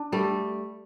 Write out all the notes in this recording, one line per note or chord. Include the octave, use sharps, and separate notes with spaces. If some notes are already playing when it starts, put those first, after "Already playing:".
Already playing: D4
G3 A3 A4